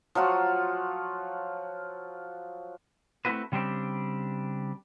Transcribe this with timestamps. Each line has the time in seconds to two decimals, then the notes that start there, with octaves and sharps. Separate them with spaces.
0.15 F3 F#3 F4 F#4
3.25 A3 C4 C#4 E4 F#4 B4
3.52 C#3 G3 C4 D4 G4